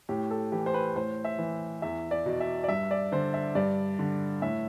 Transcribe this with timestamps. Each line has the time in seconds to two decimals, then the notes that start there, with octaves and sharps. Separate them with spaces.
0.09 A2 G4
0.31 A4
0.52 E3 G4
0.66 C5
0.74 B4
0.96 A2 C5
1.25 E5
1.38 E3
1.82 E2 E5
2.11 D5
2.26 B2
2.40 E5
2.64 D5
2.68 G2 E5
2.91 D5
3.12 D3 C5
3.34 E5
3.55 G2 D5
3.99 D3
4.42 A2 E5